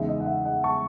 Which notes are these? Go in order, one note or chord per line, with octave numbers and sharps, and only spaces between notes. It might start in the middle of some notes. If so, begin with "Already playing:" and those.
Already playing: E2 C#3 G#3 D#4 E5
D#5
F#5
E5
D#5 F#5
A5 C#6